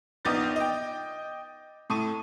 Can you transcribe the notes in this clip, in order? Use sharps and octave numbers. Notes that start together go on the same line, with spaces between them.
A#1 B3 D#4 D6 G6 A6
D#5 G5
A2 A4 C#6 D#7